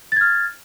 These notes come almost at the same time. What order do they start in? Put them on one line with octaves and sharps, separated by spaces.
A6 G#6 F6